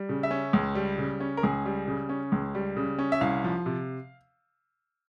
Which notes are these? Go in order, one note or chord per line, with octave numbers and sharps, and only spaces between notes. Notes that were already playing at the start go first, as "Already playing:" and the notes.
Already playing: G3
C#3
E5
C#4
C#2
G3
C#3
C#4
A#4
C#2 G#4
G3
C#3
C#4
C#2
G3
C#3
C#4
E5
C2 F5
F3
C3